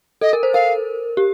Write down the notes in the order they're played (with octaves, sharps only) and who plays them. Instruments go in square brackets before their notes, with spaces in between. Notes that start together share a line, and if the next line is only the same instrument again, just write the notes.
[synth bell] A4 [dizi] D#5
[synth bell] A#4
C5
[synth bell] A#4 [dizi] F5
[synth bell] G4